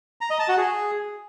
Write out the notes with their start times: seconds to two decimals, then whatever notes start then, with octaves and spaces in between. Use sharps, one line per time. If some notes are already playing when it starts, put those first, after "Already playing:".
0.21 A#5
0.30 D#5
0.39 A5
0.48 F#4
0.57 G#4